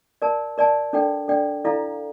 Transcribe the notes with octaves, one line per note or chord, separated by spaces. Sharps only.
A#4 D5 A5
A#4 D5 A5
D4 A4 D5 G5
D4 A4 D5 G5
E4 A4 D5 F5 A#5